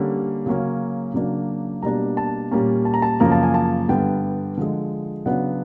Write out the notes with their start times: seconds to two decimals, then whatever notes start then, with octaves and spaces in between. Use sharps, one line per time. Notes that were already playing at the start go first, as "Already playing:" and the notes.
Already playing: D3 G3 A#3 C#4
0.46 C#3 F#3 A#3 C#4
1.14 C#3 F#3 A#3 D4
1.83 B2 G3 A#3 D4 A#5
2.17 A5
2.51 A#2 G3 A#3 C#4 A#5
2.85 A5
2.94 A#5
3.02 A5
3.20 F#2 C#3 F3 A#3 A#5
3.32 A5
3.43 G#5
3.54 A5
3.89 G2 D3 G3 B3 G5
4.57 D3 F3 G#3
5.26 C#3 F#3 B3 D4 F#5